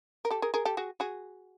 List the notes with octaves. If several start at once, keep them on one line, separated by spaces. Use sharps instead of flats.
A#4
G4 A4
G#4 A#4
G#4 A#4
G4 A4
F#4 G#4
F#4 G#4